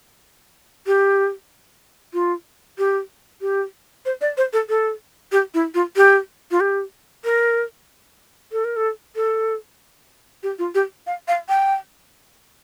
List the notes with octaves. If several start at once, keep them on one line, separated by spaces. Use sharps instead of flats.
G4
F4
G4
G4
C5
D5
C5
A4
A4
G4
E4
F4
G4
F4
G4
A#4
A4
A#4
A4
A4
G4
F4
G4
F5
F5
G5